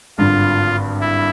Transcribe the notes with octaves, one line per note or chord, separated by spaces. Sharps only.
G#1 G2 D3 F4
E4